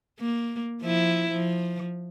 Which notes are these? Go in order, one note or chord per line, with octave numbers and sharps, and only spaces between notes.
A#3
F3 E4
F3